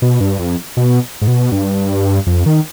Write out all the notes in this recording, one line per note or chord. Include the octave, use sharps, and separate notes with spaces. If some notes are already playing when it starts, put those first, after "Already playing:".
B2
G2
F2
B2
G#2
B2
G2
F2
D#3